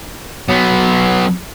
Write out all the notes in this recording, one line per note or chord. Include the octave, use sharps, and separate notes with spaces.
F#3 B3